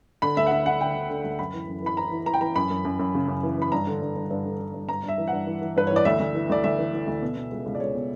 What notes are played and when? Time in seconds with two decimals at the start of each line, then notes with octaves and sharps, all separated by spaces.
0.22 D3 B5
0.37 D2 E5
0.46 F#5
0.51 D3 E5
0.66 D3 F#5
0.81 D3 G5
0.95 D3
1.10 D3
1.24 D2
1.39 F#2 B5
1.54 E3
1.68 F#2
1.83 E3 B5
1.97 E3 A#5
2.11 E3
2.26 E3 A#5
2.34 G5
2.41 E3 A#5
2.55 F#2 B5
2.70 F#2
2.85 F#2
2.99 F#2
3.14 C#3
3.28 F#2
3.43 E3
3.58 E3 B5
3.72 G2 A#5
3.87 D3
4.01 G2
4.16 G2
4.31 G2
4.45 D3
4.60 D3
4.74 G2
4.89 G2 A#5
5.03 G2 E5
5.18 E3
5.28 F#5
5.33 G2
5.47 E3
5.62 E3
5.76 G2 B4
5.87 E3 C#5
5.96 D5
6.05 D2 E5
6.20 D2
6.35 E3
6.50 D2 D5
6.64 D2 E5
6.78 E3
6.93 E3
7.07 D2
7.22 B2
7.37 B2
7.51 C#2
7.66 C#2
7.75 D5
7.80 C#2 C#5
7.95 B2